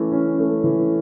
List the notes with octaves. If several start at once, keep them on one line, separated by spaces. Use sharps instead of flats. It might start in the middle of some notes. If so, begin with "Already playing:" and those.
Already playing: E3 A3 C#4
C#4
A3
E3